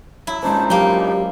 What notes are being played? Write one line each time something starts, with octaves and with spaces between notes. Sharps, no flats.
F#3 E4
G2 A#2 G#3 C#4 D#4 C5 A5
F#3 A#3 G4 G5